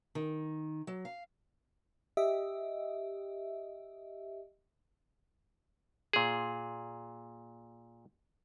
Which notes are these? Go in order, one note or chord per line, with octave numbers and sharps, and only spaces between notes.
D#3
F#3
F5
G4 D#5 E5
A#2 G#4